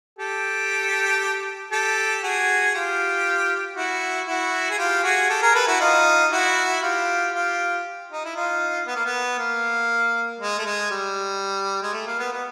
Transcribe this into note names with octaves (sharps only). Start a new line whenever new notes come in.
G4 A4
G4 A4
F#4 G#4
F4 G4
E4 F#4
E4 F#4
G#4
F4 G4
F#4 G#4
G4 A4
G#4 A#4
A4 B4
E4 F#4
D#4 F4
E4 F#4
F4 G4
F4 G4
D#4
E4
D#4 F4
B3
A#3
B3
A#3
G#3
A3
G#3
G3
G#3
A3
A#3
B3
B3